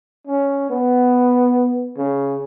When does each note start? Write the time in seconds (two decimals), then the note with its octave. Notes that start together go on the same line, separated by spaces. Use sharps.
0.27 C#4
0.70 B3
1.97 C#3